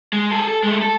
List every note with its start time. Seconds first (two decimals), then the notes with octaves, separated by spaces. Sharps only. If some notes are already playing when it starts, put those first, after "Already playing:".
0.13 G#3
0.32 G#4 A4
0.48 A4
0.64 G#3 A3
0.82 A4